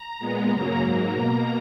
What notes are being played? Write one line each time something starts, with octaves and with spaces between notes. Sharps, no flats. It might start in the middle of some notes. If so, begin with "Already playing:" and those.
Already playing: A#5
A#2 G#3 B3
F#2 C#3 F#3 A#3 A#5
G#2 F#3 A#3 A#5
B2 A#3 A#5